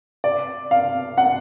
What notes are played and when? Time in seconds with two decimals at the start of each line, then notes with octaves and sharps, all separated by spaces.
0.24 D5
0.71 F5
1.18 F#5